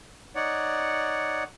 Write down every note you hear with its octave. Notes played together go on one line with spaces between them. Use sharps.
D#4 C#5 D5 F#5